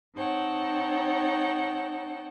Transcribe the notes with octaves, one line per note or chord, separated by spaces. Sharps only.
C4 D#4 C#5 F#5 G5 A5